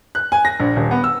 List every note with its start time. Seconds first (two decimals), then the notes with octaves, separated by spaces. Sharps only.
0.15 F#6
0.32 G#5
0.45 A#6
0.60 A#1
0.76 D#1
0.91 B3
1.04 E6